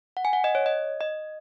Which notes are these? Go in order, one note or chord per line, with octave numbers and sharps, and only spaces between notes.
F#5
G#5
F#5
D#5
C#5
D#5
D#5